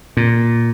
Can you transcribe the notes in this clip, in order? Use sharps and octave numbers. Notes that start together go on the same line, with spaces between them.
A#2